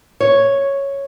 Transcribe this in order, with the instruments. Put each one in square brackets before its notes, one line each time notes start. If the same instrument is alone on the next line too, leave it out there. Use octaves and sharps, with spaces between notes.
[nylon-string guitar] C#5